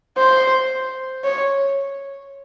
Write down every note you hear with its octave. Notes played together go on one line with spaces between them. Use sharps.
C5
C#5